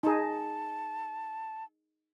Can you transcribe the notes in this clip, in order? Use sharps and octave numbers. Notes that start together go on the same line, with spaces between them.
D#4 G#4 A5